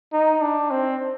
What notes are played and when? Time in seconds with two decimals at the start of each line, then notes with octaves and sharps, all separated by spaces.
0.13 D#4
0.41 D4
0.70 C4